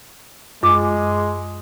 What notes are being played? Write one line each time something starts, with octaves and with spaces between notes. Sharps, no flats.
F#2 G#3 D6